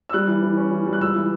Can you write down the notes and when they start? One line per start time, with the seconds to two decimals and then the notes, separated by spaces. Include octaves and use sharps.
0.09 E6
0.13 G3 F#6
0.27 E3
0.43 E3
0.57 C#4
0.72 E3
0.86 G3
0.93 F#6
1.00 C#2 E6
1.15 E3